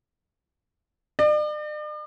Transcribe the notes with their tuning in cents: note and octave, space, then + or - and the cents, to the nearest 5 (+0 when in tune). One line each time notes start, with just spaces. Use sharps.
D5 +45